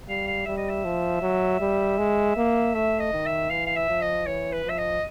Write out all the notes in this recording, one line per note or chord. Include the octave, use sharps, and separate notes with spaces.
G3 F5
F5
G3 E5
D#5
E5
F3
F#3
G3
G#3
A#3
A3 E5
D#5
D#3
E5
E3 F5
F5
E5
F3
D#5
E3 C#5
B4
F3
E5
D#5